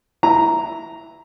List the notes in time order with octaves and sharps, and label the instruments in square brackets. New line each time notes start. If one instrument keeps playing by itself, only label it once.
[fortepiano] E4 A#5